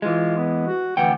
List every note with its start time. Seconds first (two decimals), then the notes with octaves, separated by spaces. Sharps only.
0.02 E3 G#3 F4
0.37 B3
0.67 F#4
0.97 D2 E3 F#5 G5